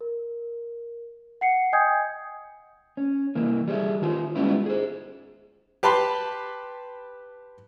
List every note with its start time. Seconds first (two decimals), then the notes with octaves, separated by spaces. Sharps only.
0.01 A#4
1.41 F#5 C7 C#7
1.73 D#5 G5 G#5 D#6 G6 G#6
2.97 C#4
3.35 C2 E3 A#3
3.68 G3 G#4 C5 E5
4.02 D#3 F4 G#5 C6
4.35 G3 G#3 B3 C#4 E4 F4
4.66 G#4 C5
5.83 G4 B4 A5 B5 C6